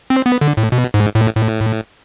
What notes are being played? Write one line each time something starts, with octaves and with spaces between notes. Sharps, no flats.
C4
B3
D3
A2
B2
G#2
A2
A2